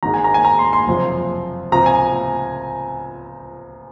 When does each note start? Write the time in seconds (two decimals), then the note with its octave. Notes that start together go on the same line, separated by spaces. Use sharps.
0.03 G#1 G#2 D#3 G#3 A#5
0.14 G#5
0.24 A#5
0.34 G#5
0.45 A#5
0.59 C6
0.73 C6
0.87 F#1 F2 C3 F3
1.72 C#2 C3 F3 A#5
1.86 G#5